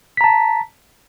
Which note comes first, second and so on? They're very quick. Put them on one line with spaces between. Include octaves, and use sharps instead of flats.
B6 A#5 A5